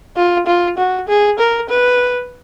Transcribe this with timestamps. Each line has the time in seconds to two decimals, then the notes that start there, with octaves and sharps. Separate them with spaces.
0.16 F4
0.46 F4
0.77 F#4
1.08 G#4
1.38 A#4
1.69 B4